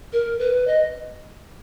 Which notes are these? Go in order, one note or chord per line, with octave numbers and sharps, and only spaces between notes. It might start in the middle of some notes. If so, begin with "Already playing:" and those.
A#4
B4
D#5